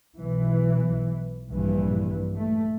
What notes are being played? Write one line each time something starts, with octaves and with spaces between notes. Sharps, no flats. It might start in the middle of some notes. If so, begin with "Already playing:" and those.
B1 E3
A#1 G2 E3
A3